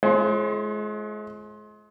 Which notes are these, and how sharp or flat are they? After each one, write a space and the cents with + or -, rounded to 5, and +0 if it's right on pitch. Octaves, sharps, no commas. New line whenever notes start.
G#3 +35 F4 -25 C5 +45